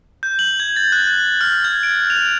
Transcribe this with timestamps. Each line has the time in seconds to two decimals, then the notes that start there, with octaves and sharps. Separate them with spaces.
0.23 G6
0.39 F#7
0.60 G#6
0.76 A6
0.92 F#6
1.07 F#6
1.41 F6
1.64 G#6
1.83 D7
2.10 F7